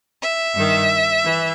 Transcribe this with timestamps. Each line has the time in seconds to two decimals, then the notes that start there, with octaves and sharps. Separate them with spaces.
0.22 E5
0.56 G2 D#3
1.24 E3